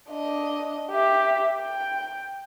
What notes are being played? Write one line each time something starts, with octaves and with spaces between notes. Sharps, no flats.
D4 D#5
G4 E5
G5